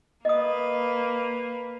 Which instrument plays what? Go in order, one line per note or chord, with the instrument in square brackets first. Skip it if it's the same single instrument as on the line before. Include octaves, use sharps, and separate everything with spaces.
[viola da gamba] A#3 B4 [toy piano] D#5 D#6